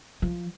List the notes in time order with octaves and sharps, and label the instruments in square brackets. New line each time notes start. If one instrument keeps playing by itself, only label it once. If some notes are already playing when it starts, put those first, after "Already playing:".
[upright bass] F3